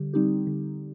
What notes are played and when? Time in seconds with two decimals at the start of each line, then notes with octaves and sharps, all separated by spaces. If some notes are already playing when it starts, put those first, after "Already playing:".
Already playing: D3 G3 G4
0.13 G3 C4 D#4 G4
0.47 D3